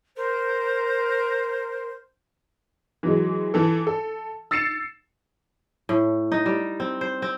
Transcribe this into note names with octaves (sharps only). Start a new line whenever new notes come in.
A#4 C5
E3 F#3 G#3
E3 A4
A4
E6 A6 C7 C#7 E7
A2
D#4
G3
C4
C5
C4